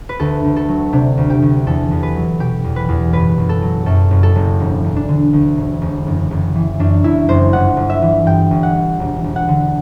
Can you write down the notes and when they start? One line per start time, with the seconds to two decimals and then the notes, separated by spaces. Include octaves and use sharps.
0.09 B4
0.20 D2 A4
0.44 D2
0.56 A4
0.69 F#3
0.93 C3 D4
1.18 D2
1.30 G4
1.42 D2
1.66 E2 A4
1.91 E2
2.03 B4
2.16 F#3
2.40 B2 G4
2.64 E2
2.76 B4
2.89 E2
3.13 F#1 B4
3.38 F#1
3.49 A4
3.62 F#3
3.86 F#2 A4
4.11 F#1
4.23 A4
4.36 F#1
4.60 E1
4.84 E1
4.96 D4
5.09 D3
5.33 D2
5.58 E1
5.81 E1
6.06 F#1
6.31 F#1
6.55 E3
6.79 F#2 D4
7.04 F#1 E4
7.28 F#1 C5
7.53 G1 F#5
7.77 G1
7.90 E5
8.02 E3
8.26 G2 G5
8.51 G1
8.63 F#5
8.75 G1
9.00 E1
9.24 E1
9.36 F#5
9.48 D3